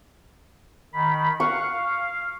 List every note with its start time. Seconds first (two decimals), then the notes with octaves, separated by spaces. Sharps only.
0.93 D#3 B5
1.40 F5 F#5 C#6
1.72 F5